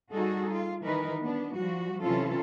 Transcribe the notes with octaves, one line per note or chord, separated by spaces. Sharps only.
G3 D#4 F#4 G#4 A4
F4
D#3 E3 G3 D#4 A#4 B4
B3 D4
F3 G3 F#4
C3 E3 F#3 C#4 F4 A4